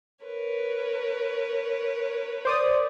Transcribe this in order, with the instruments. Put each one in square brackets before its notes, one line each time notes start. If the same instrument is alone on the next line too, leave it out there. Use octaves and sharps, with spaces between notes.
[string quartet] A#4 B4 C#5
[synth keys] C5 D5 D#6